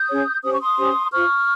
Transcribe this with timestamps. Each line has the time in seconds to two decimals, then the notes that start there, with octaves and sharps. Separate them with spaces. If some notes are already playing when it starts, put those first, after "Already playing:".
Already playing: D#6 G6
0.09 C#4 G#4 C#5
0.44 C#4 G4 C5 D#6
0.52 C#6
0.61 C6 D#6
0.78 C#4 G4 C5
1.12 F4 C5 C#6 F6